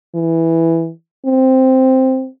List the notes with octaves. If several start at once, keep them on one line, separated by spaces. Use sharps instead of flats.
E3
C4